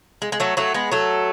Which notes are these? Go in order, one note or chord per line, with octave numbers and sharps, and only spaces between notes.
G#3
G#3
F#3 A3
F#3 A3
G#3 B3
F#3 A3